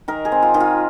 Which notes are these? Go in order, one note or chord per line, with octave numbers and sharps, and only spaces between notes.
D#3 A#4
G#4
C4
F4
D#3
F4